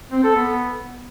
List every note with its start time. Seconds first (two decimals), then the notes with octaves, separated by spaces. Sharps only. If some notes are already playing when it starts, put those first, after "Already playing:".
0.12 C4
0.24 A4
0.35 B3